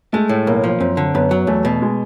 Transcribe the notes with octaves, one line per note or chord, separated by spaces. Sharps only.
G#3 A3
A2
B1 A#3
F3
F#2 C4
D3
F#2 B3
F#3
E2 A3
B2
G#3